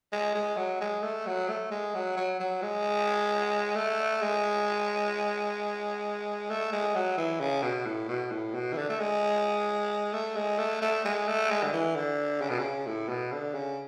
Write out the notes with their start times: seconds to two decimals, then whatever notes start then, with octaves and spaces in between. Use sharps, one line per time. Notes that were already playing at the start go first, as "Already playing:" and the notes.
0.13 G#3
0.35 G#3
0.57 F#3
0.81 G#3
1.03 A3
1.27 F#3
1.49 A3
1.71 G#3
1.95 F#3
2.17 F#3
2.40 F#3
2.62 G#3
3.76 A3
4.22 G#3
6.50 A3
6.72 G#3
6.95 F#3
7.18 E3
7.40 C#3
7.63 B2
7.86 A2
8.09 B2
8.31 A2
8.55 B2
8.73 E3
8.78 D3
8.89 A3
9.00 G#3
10.13 A3
10.36 G#3
10.59 A3
10.82 A3
11.05 G#3
11.28 A3
11.50 G#3
11.63 D3
11.73 E3
11.96 D3
12.41 C#3
12.50 B2
12.59 C#3
12.86 A2
13.09 B2
13.32 D3
13.54 C#3